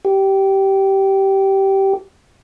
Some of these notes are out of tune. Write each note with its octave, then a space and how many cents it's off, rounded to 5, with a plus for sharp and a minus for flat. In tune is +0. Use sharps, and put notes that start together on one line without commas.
G4 -15